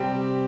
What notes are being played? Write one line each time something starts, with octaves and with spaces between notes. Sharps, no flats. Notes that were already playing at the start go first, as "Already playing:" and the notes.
Already playing: C3 G3 C4 G4